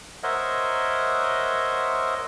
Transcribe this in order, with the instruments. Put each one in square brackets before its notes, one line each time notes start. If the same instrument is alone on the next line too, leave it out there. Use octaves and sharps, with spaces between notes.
[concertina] A#4 C5 C#5 D#5 E5 F#5